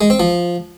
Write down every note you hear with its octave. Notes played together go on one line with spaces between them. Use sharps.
G#3
C4
F3